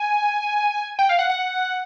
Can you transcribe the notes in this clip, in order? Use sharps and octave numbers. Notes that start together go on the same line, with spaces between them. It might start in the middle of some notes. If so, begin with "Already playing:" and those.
Already playing: G#5
G5
F5
F#5
F#5